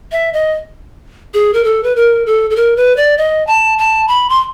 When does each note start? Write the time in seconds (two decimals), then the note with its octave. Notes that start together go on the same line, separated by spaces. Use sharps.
0.12 E5
0.33 D#5
1.34 G#4
1.54 A#4
1.64 A4
1.83 B4
1.96 A#4
2.26 A4
2.50 A4
2.56 A#4
2.77 B4
2.97 D5
3.18 D#5
3.47 A5
3.78 A5
4.08 B5
4.29 C6